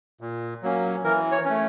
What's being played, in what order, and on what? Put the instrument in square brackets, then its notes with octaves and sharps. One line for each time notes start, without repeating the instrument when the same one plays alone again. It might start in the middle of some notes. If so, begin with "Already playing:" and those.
[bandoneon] A#2
F#3 A#3 C#4
E3 A#4
C#5
A3 C#4